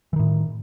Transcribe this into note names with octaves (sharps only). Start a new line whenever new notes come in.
A2 D#3 E3